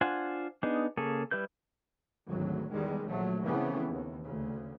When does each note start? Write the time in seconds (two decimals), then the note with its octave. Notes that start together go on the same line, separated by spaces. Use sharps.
0.01 D4 F4 C5 F#5 G#5
0.63 B3 D4 D#4 G#4
0.97 C#3 A#3 G#4 A4
1.31 G3 E4 B4 G6
2.29 G#1 D2 A2 F#3
2.72 E2 D#3 G3 G#3
3.05 A#1 F#3 A3
3.44 C#3 E3 F3 A3 B3 C4
3.90 D#2
4.23 D2 C#3